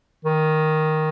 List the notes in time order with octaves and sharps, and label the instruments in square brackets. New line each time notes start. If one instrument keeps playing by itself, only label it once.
[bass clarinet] D#3